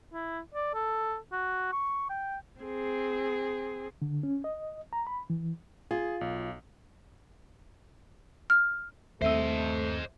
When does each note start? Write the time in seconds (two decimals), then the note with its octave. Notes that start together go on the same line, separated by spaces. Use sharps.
0.13 E4
0.54 D5
0.74 A4
1.32 F#4
1.72 C#6
2.10 G5
2.61 C4 G#4
4.02 D3
4.23 C#4
4.44 D#5
4.93 A#5
5.07 B5
5.30 E3
5.91 F4 G#4
6.21 B1
8.50 F6
9.22 D#2 A3 A#3 C4 C5 D#5 E5 E6